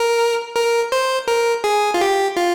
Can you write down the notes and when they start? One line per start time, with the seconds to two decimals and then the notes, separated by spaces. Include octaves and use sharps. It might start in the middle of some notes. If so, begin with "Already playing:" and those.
Already playing: A#4
0.56 A#4
0.92 C5
1.28 A#4
1.64 G#4
1.94 F4
2.01 G4
2.37 F4